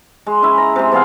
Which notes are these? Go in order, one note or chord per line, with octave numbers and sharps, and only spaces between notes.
G#3
C#4 E4 B4 E5
A#5
C3 G#3
F3 B3 G#4 F5